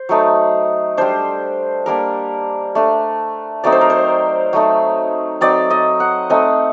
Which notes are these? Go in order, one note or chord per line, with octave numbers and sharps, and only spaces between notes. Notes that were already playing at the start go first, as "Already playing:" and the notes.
Already playing: C5
F#3 A3 D#4
G3 D4 C5
G3 A#3 D4 A#4
A3 D4
F#3 A3 C4 D#4 D5
C5
A#4
C5
F#3 A3 D#4
F#3 C4 D#4 D5
D#5
F#5
A3 C4 D#4 D#5